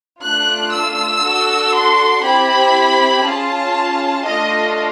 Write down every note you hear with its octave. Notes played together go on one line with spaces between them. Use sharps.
A3 D4 F4 F#6
E6
D4 F#4 A4
C6
C4 E4 G4 B5
C#4 F4 G#4 A5
A3 D4 F4 A4 D#5